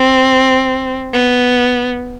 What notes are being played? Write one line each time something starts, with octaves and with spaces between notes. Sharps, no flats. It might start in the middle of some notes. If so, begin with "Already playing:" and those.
Already playing: C4
B3